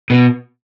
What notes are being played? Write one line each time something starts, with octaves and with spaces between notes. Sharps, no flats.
B2